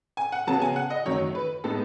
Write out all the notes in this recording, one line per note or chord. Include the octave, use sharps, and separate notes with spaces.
G#5
F#5
C#3 F#3 B3 A5
G#5
F#5
D#5
F#2 D#3 F#3 A3 D#4 C#5
B4
A2 G#3 B3 D#4 A4